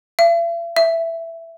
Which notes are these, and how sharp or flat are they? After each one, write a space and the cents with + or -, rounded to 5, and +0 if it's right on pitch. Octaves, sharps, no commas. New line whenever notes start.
E5 +45
E5 +10